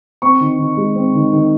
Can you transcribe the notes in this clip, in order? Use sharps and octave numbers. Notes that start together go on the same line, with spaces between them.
C4 C#6
D#3
D#3
G#3
C4
D#3
D#3